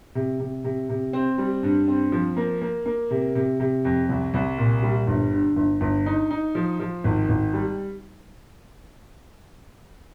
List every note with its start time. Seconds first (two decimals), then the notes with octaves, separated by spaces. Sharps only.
0.15 C3
0.40 C3
0.64 C3
0.89 C3
1.13 C4
1.38 G3
1.63 G2
1.88 C4
2.12 F3
2.37 A#3
2.62 A#3
2.86 A#3
3.11 C3
3.35 C3
3.60 C3
3.85 F2
4.09 C2
4.34 C2
4.58 A#2
4.83 G3
5.07 G1
5.32 D3
5.56 G1
5.81 G1
6.06 D#4
6.31 D#4
6.55 F3
6.80 F3
7.04 G#1
7.29 G#1
7.54 G3